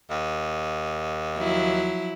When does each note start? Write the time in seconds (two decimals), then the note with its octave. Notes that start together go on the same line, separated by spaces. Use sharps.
0.10 D#2
1.37 F3 F#3 E4